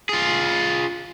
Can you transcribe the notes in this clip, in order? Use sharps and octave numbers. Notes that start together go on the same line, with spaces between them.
F4 G#4